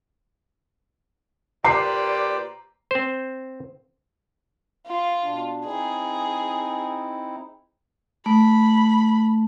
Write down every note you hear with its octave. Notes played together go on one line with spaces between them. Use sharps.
A#2 G4 B4 C5 D5 A#5 C7
C4 C5
F4
B2 D4
C4 D#4 E4 G#4
A3 B5